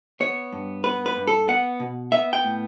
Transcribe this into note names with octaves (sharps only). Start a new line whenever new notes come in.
B3 C#5
G2
B3 B4
B4
G2
A4
B3 F#5
B2
B3 E5
G5
A2